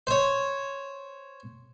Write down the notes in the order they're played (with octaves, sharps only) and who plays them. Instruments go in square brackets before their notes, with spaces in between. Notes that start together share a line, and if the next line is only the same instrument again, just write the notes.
[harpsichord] C5 C#5